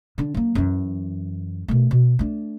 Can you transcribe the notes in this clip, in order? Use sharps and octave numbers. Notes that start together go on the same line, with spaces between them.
D3 D4
F#3 A#3
F#2 E3
B2 A3
B2
A3 D4